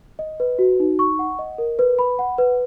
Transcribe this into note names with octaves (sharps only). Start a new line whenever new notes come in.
D#5
B4
F#4
D#4
C#6
F#5
D#5
A#4
B4
B5
F#5
B4